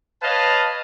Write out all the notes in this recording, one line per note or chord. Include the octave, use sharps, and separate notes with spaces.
B4 C#5 D#5 F5 A5